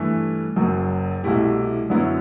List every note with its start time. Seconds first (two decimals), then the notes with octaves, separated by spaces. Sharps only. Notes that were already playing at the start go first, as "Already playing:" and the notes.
Already playing: G2 E3 A3
0.56 F#1 F#2 F#3
1.24 C2 B2 A3 E4 G4
1.90 F#2 D3 F#3 B3 E4